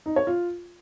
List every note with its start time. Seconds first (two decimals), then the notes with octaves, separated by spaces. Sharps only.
0.06 D#4
0.16 C#5
0.27 F4